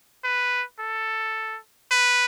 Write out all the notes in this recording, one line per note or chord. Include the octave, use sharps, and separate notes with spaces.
B4
A4
B4